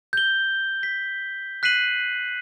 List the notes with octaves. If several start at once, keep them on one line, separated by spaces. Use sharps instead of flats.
G6 G7
B6
F#6 B6 C7 D#7 F#7